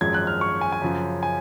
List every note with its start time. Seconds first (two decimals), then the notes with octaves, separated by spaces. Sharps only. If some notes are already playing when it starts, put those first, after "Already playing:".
0.01 G#1 F#2 F3 G#3 G#6
0.14 F#6
0.27 F6
0.41 C#6
0.61 G#5
0.72 G#5
0.82 F#2 C#3 F3
1.23 G#5